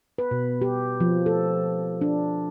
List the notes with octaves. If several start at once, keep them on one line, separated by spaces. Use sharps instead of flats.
B4
B2
G4
F3
A4
D4